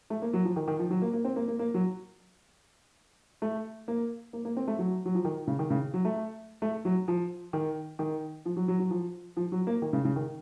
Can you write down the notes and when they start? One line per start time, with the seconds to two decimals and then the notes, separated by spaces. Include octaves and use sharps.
0.10 A3
0.22 A#3
0.33 F#3
0.45 F3
0.56 D#3
0.68 D#3
0.79 F3
0.90 F#3
1.02 A#3
1.13 A#3
1.25 C4
1.36 A#3
1.48 A#3
1.59 A#3
1.74 F#3
3.42 A3
3.88 A#3
4.33 A#3
4.45 A#3
4.57 C4
4.68 A3
4.79 F#3
5.06 F#3
5.15 F3
5.25 D#3
5.47 C#3
5.59 D#3
5.70 C#3
5.94 F#3
6.05 A3
6.62 A3
6.85 F#3
7.08 F3
7.53 D#3
7.99 D#3
8.45 F3
8.56 F#3
8.68 F#3
8.79 F#3
8.91 F3
9.37 F3
9.52 F#3
9.67 A#3
9.82 D#3
9.93 C#3
10.05 C#3
10.16 D#3